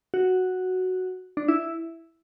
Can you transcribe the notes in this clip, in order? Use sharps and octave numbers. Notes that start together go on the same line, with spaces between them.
F#4
D4
E4